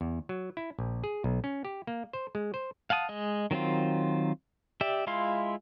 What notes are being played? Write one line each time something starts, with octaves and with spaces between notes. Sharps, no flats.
E2
F#3
E4
A#1
G#4
B1
C#4
G4
A#3
C5
G#3
C5
F5 F#5 A5 D#6
G#3 D#5
D#3 F#3 C4 F4
G4 D5 E5
G#3 E4 F4 F5 C6